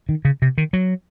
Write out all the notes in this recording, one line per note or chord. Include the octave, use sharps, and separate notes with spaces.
D#3
C#3
C3
D#3
F#3